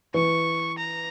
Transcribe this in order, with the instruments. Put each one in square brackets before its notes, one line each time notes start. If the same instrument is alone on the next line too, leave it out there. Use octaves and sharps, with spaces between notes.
[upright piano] E3 [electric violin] C#6
[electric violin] A#5